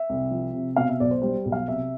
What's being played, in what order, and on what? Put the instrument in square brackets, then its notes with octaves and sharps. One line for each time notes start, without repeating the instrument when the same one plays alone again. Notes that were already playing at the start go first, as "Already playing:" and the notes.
Already playing: [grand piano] E5
C2
F3
C3
B2 F5
E5
B1 D5
C5
G3 C5
B1
F5
C3 E5